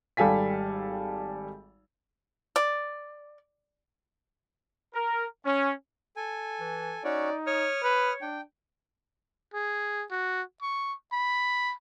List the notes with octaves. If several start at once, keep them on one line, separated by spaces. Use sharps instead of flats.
G#1 G3 A4 F5 G#5 B6
D5
A#4
C#4
A4 G#5
E3
C#4 D#4 F#4 C#5 D5
C#5 D#6 F6
B4 C#5
D4 G5
G#4
F#4
C#6
B5